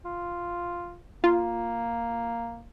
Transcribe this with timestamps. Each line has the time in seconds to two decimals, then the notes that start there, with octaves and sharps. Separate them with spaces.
0.05 F4
1.24 A#3 F4